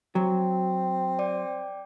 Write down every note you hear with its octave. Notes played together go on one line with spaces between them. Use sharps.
F#3 C4
D5 G5 D6